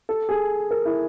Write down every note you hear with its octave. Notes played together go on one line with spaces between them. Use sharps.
A4
G#4
A#4
E4